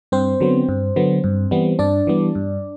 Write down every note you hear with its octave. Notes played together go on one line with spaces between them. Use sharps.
G2 C4 C5
D3 F#3 B3
G2
D3 F#3 B3
G2
E3 G3 B3
G2 D4 D5
E3 G3 B3
G2